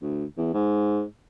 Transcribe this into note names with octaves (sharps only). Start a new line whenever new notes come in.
D2
E2
G#2